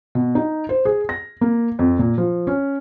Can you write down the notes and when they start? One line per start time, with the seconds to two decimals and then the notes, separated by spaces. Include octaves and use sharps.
0.15 B2
0.35 D#4
0.69 C5
0.85 G#4
1.09 A#6
1.41 A#3
1.79 F2
1.99 A#2
2.18 F3
2.47 C#4